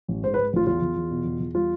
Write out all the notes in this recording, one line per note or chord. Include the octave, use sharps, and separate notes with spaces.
A1
G#2 C5
G#2 B4
A1 F4
E2 F4
E2
E2
B2
E2
E2
G3 F4